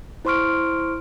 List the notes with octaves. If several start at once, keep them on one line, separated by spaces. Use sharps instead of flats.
E4 C5 C6 C#6 F6 D7